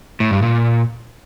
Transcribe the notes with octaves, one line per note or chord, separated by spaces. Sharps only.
A2
G2
A#2